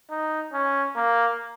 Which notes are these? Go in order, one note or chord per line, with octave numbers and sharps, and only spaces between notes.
D#4
C#4
A#3